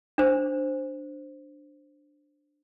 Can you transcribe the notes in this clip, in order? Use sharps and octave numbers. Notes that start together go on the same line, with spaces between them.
D4 C5